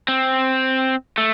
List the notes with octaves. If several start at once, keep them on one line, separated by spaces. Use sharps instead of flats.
C4
A3